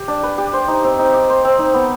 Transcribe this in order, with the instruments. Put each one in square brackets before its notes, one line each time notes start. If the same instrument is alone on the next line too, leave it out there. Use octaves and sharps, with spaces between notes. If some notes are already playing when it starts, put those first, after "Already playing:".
Already playing: [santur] G4
D4
B4
G4
C5
D#4
C4
D#4
G4
C5
C4
D#4
B3